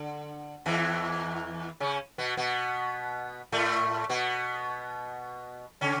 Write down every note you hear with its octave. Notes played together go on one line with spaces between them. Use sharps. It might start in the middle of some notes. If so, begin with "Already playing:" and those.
Already playing: D3
E2 E3
C#3 C#4
B2 B3
B2 B3
A2 A3
B2 B3
C#3 C#4